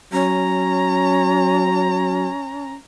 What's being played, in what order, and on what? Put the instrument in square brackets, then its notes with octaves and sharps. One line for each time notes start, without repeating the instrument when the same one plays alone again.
[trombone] F#3 [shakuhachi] C#4 [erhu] A#5